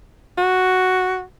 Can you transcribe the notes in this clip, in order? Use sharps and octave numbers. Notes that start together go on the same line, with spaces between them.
F#4